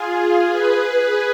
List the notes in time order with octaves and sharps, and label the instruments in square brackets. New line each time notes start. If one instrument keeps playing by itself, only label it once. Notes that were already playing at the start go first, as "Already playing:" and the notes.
Already playing: [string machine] F4 G#4
G#4 B4